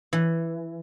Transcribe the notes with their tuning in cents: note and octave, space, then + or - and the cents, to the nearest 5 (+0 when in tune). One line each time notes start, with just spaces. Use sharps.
E3 +5